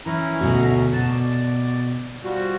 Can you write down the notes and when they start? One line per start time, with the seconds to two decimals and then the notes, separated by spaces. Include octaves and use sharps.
0.06 E3 C#4 E4 A#5
0.41 D2 B2 F#4
0.93 B2 A5
1.11 D5
2.24 F3 G3 F#4